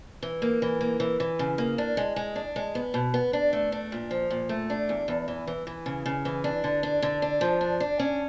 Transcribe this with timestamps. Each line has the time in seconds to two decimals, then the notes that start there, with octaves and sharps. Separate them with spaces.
0.22 E3
0.42 A#3
0.62 E3
0.81 A#3
1.00 E3
1.20 E3
1.39 C#3
1.58 A#3
1.78 D4
1.97 G#3
2.16 G#3
2.36 D4
2.56 G#3
2.75 B3
2.94 B2
3.14 B3
3.33 D4
3.53 A3
3.72 D4
3.92 A#2
4.11 F3
4.30 A#2
4.49 A3
4.70 D4
4.89 E2
5.08 E2
5.28 E3
5.47 E3
5.67 E3
5.86 C#3
6.06 C#3
6.25 E3
6.44 D4
6.64 D3
6.83 D4
7.02 D3
7.22 D4
7.41 F3
7.61 D4
7.80 D4
7.99 C#4